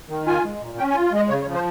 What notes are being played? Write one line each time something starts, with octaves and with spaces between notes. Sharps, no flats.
D#3
F4 G#5
G#3
A#2
C#4 G5
G#5
F4
G#3 D#5
C#3 C#5
C#5
F3
C5